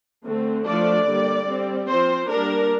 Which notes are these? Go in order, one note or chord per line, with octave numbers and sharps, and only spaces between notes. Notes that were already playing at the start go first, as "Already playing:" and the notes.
D3 A3 C4
F3 A3 D4 D5
D3 G3 A#3
G3 C4
F3 C4 C5
G3 A#3 D4 A#4